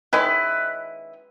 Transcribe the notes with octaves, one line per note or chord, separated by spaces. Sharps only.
D#3 G#3 C#4 E4 B4